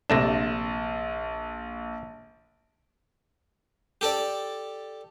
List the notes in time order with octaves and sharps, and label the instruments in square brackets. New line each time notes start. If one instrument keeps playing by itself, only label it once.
[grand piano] A#1 A#6 E7 [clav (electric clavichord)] C3 A3 D4
[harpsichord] G4 A4 D5